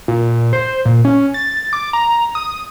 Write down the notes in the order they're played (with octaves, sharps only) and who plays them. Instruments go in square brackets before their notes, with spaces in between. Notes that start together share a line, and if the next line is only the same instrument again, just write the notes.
[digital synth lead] A#2
C5
A#2
C#4
A6
D6
A#5
D#6